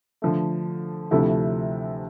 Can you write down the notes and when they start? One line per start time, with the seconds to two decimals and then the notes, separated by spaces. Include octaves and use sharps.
0.22 D3 F3 A3
1.11 D2 C3 F3 A3 E4